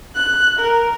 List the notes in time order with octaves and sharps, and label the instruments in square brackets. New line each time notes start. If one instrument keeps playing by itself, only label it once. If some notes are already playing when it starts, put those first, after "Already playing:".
[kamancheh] F#6
A#4